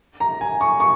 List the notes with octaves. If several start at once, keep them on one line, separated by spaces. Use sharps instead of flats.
A#5
G#5
C#6
C#6